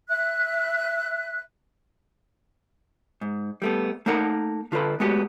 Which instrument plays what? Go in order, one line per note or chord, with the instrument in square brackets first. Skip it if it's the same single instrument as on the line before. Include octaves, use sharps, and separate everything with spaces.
[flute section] E5 F#6
[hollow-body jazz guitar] G#2
G3 A3 B3
A3 A#3 D#4 A#4 F#5
D3 F4 A4 B4 B5
G#3 A3 B3 F#4 G4